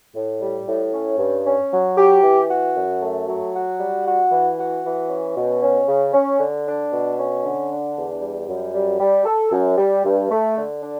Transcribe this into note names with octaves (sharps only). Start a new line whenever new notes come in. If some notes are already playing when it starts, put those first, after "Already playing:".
A2
G3
A2
C#4
G2
C#4
F#3
G4
E3
F#4
F#2
A3
F#3
F#4
G3
F#4
E3
F#4
E3
C#4
B2
C#4
C#3
C#4
D3
D4
B2
C#4
D3
D4
E2
G3
F#2
G3
G3
A4
F#2
G3
G2
A3
D3
D4